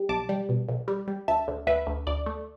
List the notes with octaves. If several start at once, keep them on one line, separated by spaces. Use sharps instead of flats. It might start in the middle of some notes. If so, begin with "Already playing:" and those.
Already playing: G3
B1 A5 D6
G3
B2
B1
G3
G3
D2 E5 A5
D2
D2 B4 E5
D2
D2 D5
A3